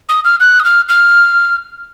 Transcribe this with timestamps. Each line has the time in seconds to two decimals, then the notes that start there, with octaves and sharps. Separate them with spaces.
0.09 D#6
0.25 F6
0.40 F#6
0.60 D#6
0.64 F6
0.89 F6